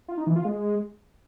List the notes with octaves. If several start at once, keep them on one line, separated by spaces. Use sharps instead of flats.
F4
D#4
E3
F4
G#3